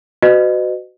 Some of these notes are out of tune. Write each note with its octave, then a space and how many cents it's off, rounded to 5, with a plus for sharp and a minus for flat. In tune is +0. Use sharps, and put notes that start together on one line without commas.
F#4 +5 B4 +35 D#5 -25